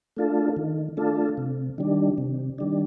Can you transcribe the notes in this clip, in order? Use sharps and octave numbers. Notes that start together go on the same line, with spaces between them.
A3 D4 F4 A4
D#3
A3 D4 F4 A4
C3
D#3 G3 D4
C3
D#3 G3 D4